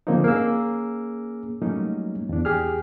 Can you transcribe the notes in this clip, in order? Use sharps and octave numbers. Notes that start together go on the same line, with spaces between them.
D3 F3 A#3 C4 C#4 D#4
A#3 C#4 G#4 E6
F#3 G3 A3 A#3 C#4 D#4
E2 D4
E2 G4 G#4 F6